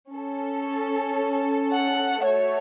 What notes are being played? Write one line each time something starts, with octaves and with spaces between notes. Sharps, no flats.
C#4 A4
F#5
A3 F#4 A4 C#5